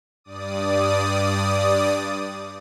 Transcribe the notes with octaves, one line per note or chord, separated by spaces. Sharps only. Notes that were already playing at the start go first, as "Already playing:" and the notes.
G2 D5 D#6